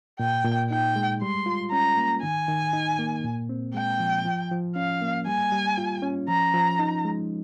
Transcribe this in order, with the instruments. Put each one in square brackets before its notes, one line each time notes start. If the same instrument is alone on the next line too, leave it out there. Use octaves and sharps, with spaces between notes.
[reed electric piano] A#2 [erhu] G5
[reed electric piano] A#2
[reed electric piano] D#4 [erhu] G5
[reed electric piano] G#3
[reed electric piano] G3 [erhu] C6
[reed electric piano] F4
[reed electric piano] C#4 [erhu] A#5
[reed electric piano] A#3
[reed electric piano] D#3 [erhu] G#5
[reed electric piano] D#3
D#4
A#3
A#2
C4
[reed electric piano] G#3 [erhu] G5
[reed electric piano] F3
F3
F3
[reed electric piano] C#4 [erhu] F5
[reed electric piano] A#3
[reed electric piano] G3 [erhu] G#5
[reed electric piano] G3
F4
C#4
[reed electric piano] F3 [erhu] A#5
[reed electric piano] F3
D#4
G#3